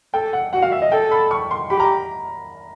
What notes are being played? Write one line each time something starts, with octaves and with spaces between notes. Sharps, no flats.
A4 G5
F#5
F#4 F#5
F5
E5
D#5
A4 G5
B5
C#6
C6
G4 B5
A#5